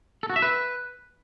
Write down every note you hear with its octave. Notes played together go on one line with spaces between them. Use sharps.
A4
F#4
E5
B4